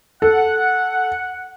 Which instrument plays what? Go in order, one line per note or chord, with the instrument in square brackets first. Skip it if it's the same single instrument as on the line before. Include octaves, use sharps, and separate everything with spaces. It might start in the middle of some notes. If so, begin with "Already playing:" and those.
[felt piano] A4 [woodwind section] F#5